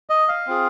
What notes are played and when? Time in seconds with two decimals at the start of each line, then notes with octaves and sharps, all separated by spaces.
0.10 D#5
0.28 F5
0.47 C4 F4 G#4